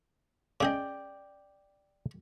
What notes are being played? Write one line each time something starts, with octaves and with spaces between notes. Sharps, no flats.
C#3 G#4 D5 D#5 G5